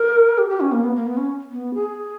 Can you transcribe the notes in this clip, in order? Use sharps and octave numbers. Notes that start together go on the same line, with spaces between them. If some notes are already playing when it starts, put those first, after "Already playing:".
Already playing: A#4
G4
G4
C#4
A#3
B3
A#3
B3
C#4
B3
G#4